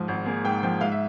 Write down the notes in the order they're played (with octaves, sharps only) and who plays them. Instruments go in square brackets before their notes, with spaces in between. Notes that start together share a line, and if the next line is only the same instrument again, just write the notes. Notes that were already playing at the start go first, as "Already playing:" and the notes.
Already playing: [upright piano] G#2 F3
G#1
A#3 G#4
G#2 G5
F3 G5
G#2 F5
E5